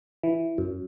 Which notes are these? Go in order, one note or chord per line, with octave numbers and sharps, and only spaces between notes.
E3
F#2